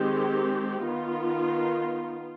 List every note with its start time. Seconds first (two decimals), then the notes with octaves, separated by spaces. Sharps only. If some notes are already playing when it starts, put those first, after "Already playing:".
Already playing: D#3 G#3 C4 G4
0.84 D#3 B3 D#4 F4